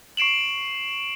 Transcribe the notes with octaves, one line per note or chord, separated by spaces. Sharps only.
C#6 C7 D7 E7 F#7